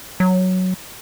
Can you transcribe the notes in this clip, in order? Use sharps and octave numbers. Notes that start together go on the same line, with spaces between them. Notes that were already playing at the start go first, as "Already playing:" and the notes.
F#3